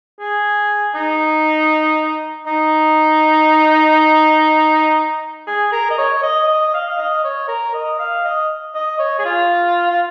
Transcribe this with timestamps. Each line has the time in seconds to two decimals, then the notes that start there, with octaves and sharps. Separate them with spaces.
0.20 G#4
0.95 D#4
2.46 D#4
5.48 G#4
5.72 A#4
5.90 D#5
5.98 C#5
6.23 D#5
6.48 D#5
6.74 F5
6.88 F5
6.98 D#5
7.24 C#5
7.48 A#4
7.74 D#5
7.99 F5
8.25 D#5
8.75 D#5
8.99 C#5
9.19 G#4
9.25 F4
9.90 F4